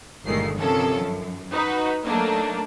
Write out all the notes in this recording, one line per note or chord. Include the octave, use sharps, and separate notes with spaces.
G1 A#2 D#3 G#3 A3 C7
C3 D#3 F3 C#4 A4
F#2
D#4 F#4 B4
F#3 A3 A#3 D4 D#4